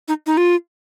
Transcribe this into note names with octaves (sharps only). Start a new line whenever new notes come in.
D#4
D#4
F4